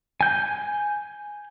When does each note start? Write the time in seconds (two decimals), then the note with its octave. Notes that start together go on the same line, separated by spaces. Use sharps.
0.21 G#5 G6